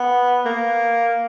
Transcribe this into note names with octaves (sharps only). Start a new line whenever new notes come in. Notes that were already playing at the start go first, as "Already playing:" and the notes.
Already playing: B3
A#3